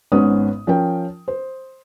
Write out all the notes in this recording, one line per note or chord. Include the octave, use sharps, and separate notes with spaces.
G#1 G#2 B3 C#4 D#6
F3 C#4 A#4 G5
C5